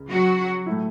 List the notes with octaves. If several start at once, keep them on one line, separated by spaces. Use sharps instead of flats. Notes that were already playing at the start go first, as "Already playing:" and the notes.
Already playing: C#2 C#3
F#3 F#4
A2 A3 E4